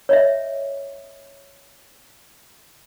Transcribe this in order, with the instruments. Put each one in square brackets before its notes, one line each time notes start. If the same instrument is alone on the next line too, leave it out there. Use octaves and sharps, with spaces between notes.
[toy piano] C#5 D#5 E5